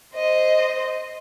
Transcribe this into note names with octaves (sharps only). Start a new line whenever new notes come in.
C5 D#5